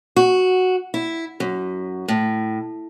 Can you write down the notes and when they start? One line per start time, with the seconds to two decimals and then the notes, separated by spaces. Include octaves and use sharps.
0.16 F#4
0.94 E4
1.40 F#2
2.08 A2